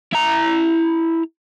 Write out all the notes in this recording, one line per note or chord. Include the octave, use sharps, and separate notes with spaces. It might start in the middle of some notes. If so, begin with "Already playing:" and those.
E4 A#5